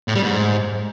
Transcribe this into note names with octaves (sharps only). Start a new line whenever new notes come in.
A2
G3
G#2